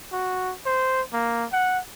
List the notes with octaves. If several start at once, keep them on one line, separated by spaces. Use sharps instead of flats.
F#4
C5
A#3
F#5